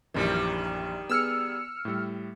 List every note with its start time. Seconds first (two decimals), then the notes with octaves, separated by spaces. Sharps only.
0.14 A#1 F#2 D#3 E3 G3
1.09 B3 G#4 E6 F6 C#7
1.85 A2 G3